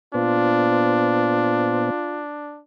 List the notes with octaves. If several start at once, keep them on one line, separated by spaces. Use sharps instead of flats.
A#2 B3 D4 F4 C5